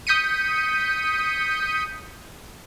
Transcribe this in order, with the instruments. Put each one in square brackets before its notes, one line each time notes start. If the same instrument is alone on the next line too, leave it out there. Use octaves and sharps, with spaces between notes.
[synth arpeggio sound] D#6 G6 B6 C#7 D#7